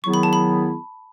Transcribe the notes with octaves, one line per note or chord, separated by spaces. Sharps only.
D#3 F#3 B3 E4 G#4 C#6
B5
A5
B5